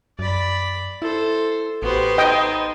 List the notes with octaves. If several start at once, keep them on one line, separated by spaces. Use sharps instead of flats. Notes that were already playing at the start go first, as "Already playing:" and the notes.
F#2 D5 B5
E4 A4 C5
A1 B3 F#4 G4 C5
D#4 D#5 G5